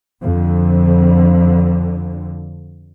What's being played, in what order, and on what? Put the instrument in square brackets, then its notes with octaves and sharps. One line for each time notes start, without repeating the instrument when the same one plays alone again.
[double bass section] F2 D3